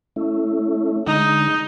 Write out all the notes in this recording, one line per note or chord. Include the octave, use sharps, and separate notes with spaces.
A3 C#4 E4
D3 G#3 D#4